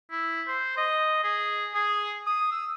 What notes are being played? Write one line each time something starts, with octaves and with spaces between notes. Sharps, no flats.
E4
C5
D#5
G#4
G#4
D#6
E6